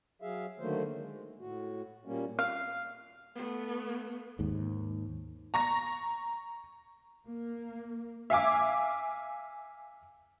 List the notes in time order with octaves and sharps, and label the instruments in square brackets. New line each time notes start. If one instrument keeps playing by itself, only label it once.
[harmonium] F#3 G#4 E5 F5
D3 D#3 F#3 A3 A#3 C5
G#3
A2 F#4
A#2 G3 A#3 C#4
[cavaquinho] F5
[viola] A3 B3
[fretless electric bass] D#2 G#2
[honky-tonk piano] A#5 C#6 A#6
[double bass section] A#3
[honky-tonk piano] E5 F5 G#5 D6